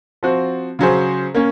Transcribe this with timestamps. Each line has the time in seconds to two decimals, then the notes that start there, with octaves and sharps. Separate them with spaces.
0.23 F3 C4 F#4
0.79 C#3 F#3 C#4 G#4 C5
1.34 A#3 C#4